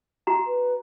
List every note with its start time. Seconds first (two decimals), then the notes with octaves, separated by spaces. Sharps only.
0.27 F#4 A#5
0.47 B4